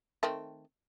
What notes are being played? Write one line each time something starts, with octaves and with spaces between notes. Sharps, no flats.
D#3 A3 C4